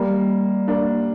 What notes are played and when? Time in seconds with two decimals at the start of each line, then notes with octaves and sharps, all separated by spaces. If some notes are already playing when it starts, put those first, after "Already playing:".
Already playing: G3 A#3
0.68 A#3 D4